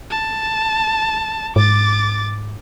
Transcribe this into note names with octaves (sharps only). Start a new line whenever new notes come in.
A5
G#2 D6 A6